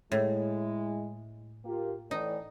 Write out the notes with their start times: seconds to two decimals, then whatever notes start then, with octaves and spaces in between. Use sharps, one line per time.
0.12 A2 G#3 E4
1.65 A#3 F4 G4
2.11 A2 E3 D#4 D5